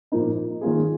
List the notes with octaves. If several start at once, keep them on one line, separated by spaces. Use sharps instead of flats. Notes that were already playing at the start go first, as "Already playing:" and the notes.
A#2 F3 A#3 D#4
D#3 A#3 F4 G#4